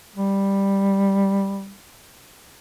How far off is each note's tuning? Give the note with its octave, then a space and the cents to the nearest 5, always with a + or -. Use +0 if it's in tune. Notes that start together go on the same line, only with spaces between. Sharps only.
G3 +5